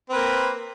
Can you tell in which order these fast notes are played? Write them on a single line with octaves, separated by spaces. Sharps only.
C4 B4 A#3